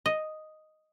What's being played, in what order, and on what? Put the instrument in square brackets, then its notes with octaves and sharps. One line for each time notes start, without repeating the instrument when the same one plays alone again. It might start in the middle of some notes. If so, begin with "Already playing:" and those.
[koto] D#5